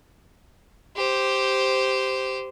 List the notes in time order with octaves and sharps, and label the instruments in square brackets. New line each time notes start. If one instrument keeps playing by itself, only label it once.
[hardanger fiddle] G4 C5